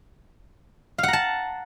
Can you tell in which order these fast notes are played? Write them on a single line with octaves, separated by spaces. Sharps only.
F5 F#5 A#5 A5